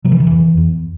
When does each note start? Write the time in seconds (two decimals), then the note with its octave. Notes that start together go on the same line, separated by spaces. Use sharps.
0.04 C3 F#3
0.12 E3
0.20 D#3
0.27 E2 E3
0.57 E2